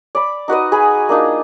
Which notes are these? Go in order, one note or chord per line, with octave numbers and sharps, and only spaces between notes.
D5 B5
D#4 F#4 B4 D#5
G#4 G#5 B5
A#3 D4 D#4 F4